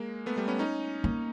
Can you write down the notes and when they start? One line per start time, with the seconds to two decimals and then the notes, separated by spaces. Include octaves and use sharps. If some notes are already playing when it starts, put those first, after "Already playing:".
Already playing: G#3 A#3
0.26 A3 B3
0.37 G3 A3
0.48 B3 C#4
0.59 C#4 D#4
1.04 A#3